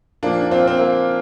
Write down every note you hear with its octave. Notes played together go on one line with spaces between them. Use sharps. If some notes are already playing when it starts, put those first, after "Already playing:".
A#2 F3 A#3 D4
D4
C4 F4
C4
A#3